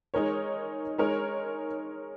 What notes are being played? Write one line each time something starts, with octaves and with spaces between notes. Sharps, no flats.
G#3 D#4 A#4 C#5
G#3 D#4 A#4 C#5